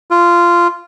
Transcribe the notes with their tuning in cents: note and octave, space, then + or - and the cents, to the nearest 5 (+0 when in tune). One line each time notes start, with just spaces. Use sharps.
F4 -15